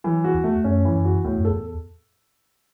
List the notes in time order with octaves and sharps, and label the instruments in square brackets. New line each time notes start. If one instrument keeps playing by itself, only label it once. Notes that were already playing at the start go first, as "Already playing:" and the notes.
[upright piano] E3 [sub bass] F#3
[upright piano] F#4
[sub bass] E2
[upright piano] A3
[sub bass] F#2 [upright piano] C#4
[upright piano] E3
[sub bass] F#2
[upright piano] F#4
[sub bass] E2 [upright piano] A2
[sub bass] F#2
[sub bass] E2 [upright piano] A4